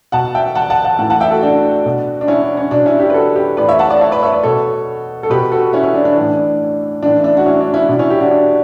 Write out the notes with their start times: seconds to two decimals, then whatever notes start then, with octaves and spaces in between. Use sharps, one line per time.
0.12 B2 F#5 A5
0.35 E5 G5
0.55 F#5 A5
0.70 F#5 A5
0.85 F#5 A5
0.99 A2 F#5 A5
1.02 E3
1.10 F#5 A5
1.20 E5 G5
1.31 F#4 A4
1.43 D4 F#4
1.86 B2
2.21 D4
2.28 C#4 E4
2.42 D4
2.57 C#4
2.71 B2 D4
2.86 C#4 E4
3.00 E4 G4
3.10 B4
3.14 F#4 A4
3.36 G4 B4
3.57 A2 E3 B4 D5
3.68 C#5 E5
3.79 F#5 A5
3.90 D5 F#5
4.01 C#5 E5
4.11 B4 D5
4.23 C#5 E5
4.32 B4 D5
4.43 B2 A4 C#5
5.23 A4
5.30 B2 G4 B4
5.51 F#4 A4
5.73 C#4 E4
5.83 C#4 E4
5.94 D4
6.05 D4
6.16 A2 E3 D4
7.03 A2 E3 D4
7.19 E4
7.24 D4
7.37 F#4
7.46 C#4 E4
7.61 D4
7.74 C#4 E4
7.89 B2 D4
7.99 C#4 E4
8.10 E4 G4
8.20 D4 F#4
8.31 D4